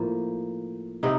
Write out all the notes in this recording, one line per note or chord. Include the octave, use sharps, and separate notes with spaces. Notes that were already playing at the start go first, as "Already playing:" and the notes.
Already playing: A2 F3 A#3
C3 D#4